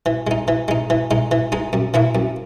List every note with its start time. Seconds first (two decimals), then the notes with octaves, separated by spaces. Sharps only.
0.06 E3
0.27 G#3 D#4
0.48 E3
0.68 G#3 D#4
0.90 E3
1.11 G#3 D#4
1.31 E3
1.52 G#3 D#4
1.73 F#2
1.94 E3 A#3 E4
2.15 F#2